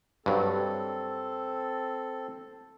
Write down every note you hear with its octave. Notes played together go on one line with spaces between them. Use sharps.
G2 F#3 C4 A4